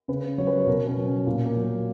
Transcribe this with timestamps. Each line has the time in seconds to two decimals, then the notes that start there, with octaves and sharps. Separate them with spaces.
0.08 C#3 B4
0.38 F#3 C#5
0.47 B4
0.58 C#5
0.67 B2 A#4
0.87 C#4
0.97 F#3
1.07 C#4
1.27 A#2 A#3
1.45 A#3
1.56 F#3